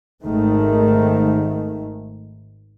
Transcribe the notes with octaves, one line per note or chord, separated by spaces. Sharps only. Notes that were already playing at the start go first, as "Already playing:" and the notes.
G#1 G#2 D#3 A3